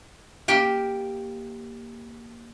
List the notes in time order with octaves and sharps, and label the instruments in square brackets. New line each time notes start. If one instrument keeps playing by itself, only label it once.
[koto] A#3 G4 G5